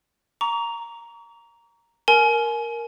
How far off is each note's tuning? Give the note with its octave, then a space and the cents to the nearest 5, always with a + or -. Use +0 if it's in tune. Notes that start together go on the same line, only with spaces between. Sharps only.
A#5 +0 C#6 +45
A#4 +0 G#5 +30